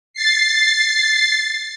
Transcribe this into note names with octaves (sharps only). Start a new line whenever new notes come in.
A6 C7